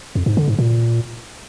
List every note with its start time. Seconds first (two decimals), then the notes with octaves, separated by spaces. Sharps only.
0.15 F2
0.26 G#2
0.37 D3
0.48 G#2
0.59 A#2